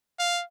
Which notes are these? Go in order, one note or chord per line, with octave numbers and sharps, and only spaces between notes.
F5